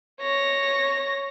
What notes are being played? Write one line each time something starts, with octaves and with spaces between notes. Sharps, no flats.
C#5 A#6